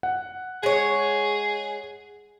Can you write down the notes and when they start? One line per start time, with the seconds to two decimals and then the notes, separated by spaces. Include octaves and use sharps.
0.03 F#5
0.63 G#3 G#4 C#5